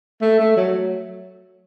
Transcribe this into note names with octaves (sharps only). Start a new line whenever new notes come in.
A3
A3
F#3